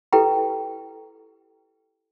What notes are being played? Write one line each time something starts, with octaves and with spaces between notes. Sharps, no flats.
E4 G4 A4 B4 G5 A#5